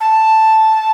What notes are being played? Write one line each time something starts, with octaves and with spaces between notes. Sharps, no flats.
A5